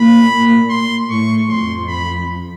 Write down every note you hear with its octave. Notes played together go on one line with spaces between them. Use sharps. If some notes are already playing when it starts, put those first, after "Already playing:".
Already playing: A#2 A#3 B5
C6
A2 A3 C#6
F2 F3 C6
B5